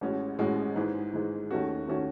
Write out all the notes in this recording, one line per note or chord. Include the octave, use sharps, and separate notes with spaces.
A1 A2 G#3 C#4 F#4
A1 A2 G#3 C#4 F#4
G#2 E3 G#3
G#2 E3 G#3
D#2 D#3 A3 C#4 F#4
D#3 A3 C#4 F#4